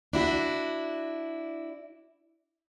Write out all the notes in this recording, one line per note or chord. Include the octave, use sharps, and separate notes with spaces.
D4 E4 F#4